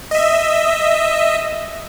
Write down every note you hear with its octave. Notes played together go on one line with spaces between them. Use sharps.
D#5 E5